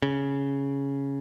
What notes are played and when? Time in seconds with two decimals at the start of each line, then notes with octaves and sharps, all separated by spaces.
0.02 C#3